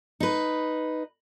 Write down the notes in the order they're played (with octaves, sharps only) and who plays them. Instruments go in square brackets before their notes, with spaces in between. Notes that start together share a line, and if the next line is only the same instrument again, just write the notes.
[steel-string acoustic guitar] D#4 B4